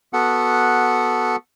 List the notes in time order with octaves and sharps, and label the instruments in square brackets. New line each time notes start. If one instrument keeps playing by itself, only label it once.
[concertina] B3 F#4 A4 F#5